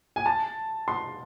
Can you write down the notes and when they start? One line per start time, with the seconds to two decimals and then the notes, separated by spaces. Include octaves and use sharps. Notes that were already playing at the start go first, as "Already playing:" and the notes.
0.16 G#5
0.26 A5
0.88 C6